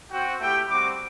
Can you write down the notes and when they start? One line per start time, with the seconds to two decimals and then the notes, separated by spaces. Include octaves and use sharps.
0.12 C4 F#4 G5
0.40 A3 E4 G4 G5
0.69 G3 C4 F#4 D6